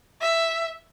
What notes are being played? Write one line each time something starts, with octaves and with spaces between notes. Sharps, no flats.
E5